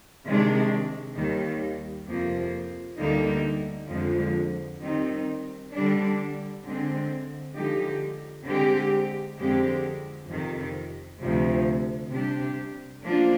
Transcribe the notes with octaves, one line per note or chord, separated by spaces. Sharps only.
C3 D#3 G#3 D4
D#2 D#3 G3
F2 C3 F3 A#3
D2 D3 G3 A#3 D#4
F2 D3 F3 G#3
D#3 G3 C4 D#4
D3 G3 D4
D3 G#3 C4
D3 F3 G#3 D#4 G4
D3 G#3 C4 G4
F2 D3 G#3 C4 G4
F2 C3 D#3
D2 C3 F3
C3 G3 D4 G4
F3 A#3 D4 F4